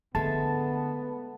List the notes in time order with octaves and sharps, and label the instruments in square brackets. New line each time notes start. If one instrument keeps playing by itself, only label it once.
[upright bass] D3 [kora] G#3 A3 [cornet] B3 [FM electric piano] A5